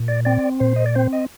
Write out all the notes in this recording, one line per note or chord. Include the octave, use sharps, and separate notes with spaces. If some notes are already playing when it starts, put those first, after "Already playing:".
Already playing: A#2
D5
C4 D5
A#2 C5
D#5
D5
C4 C5
D#5